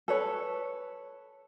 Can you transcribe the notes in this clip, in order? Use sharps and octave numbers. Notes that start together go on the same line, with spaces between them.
A4 B4 C#5